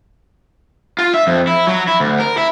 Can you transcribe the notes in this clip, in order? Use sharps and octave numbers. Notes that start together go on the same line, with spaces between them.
F4
E5
F2
E4
F#3
E4
D2
A#4
E4